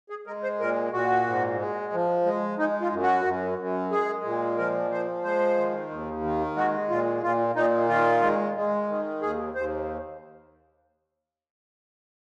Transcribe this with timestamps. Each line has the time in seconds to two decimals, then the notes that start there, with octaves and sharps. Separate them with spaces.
0.10 G#4
0.27 G#3 A#4
0.43 C5
0.60 A#2 A#4
0.93 A#2 F#4
1.26 G#2
1.59 G#3
1.93 F3
2.25 G#3
2.58 G#3 D#4
2.81 F4
2.92 F#2
3.03 F#4
3.25 F#2
3.59 F#2
3.91 G#3 G#4
4.24 A#2
4.58 F3 A#4
4.91 F3 C5
5.23 G#3 C5
5.57 D#3
5.90 D#2
6.23 D#3
6.56 G#3 F#4
6.89 A#2 F4
7.23 A#2 F4
7.55 A#2 D#4
7.89 D#3 F4
8.22 G#3
8.55 G#3
8.89 D#3
9.21 D#2 G#4
9.55 D#2 C5